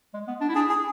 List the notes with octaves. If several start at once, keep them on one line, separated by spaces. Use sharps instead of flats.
G#3
B3
D4
E4
D4 G#4
G#4